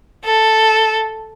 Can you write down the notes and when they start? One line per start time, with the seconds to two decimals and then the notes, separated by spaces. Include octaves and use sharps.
0.24 A4